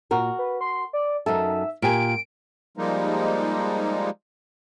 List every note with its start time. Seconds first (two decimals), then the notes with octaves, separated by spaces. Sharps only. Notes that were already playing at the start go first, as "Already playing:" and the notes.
0.11 A#2 F#4 A#4
0.39 B4
0.61 C6
0.93 D5
1.26 F#2 D#4 A4 E5
1.82 A#2 G4 G#5 D7
2.77 F3 G3 G#3 A#3 D#4